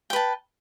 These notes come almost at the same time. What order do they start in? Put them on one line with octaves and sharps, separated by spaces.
G5 B4 A5